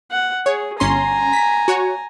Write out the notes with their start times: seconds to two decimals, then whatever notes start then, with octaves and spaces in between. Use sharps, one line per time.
0.11 F#5
0.46 G#4 C#5
0.80 G1 C#4 G#5 A#5 C6
1.33 B6
1.68 F#4 C#5